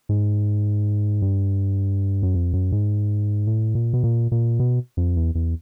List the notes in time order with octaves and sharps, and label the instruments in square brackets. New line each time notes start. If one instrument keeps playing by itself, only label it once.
[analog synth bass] G#2
G2
F#2
F2
F#2
G#2
A2
A#2
B2
A#2
A#2
B2
F2
E2
E2